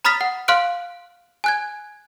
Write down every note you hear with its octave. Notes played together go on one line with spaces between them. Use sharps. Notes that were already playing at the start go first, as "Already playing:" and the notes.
A#5 B5 D#6 F6 A6 B6
F#5
F5 C6 F6 F#6 D7
G#5 F#6 G#6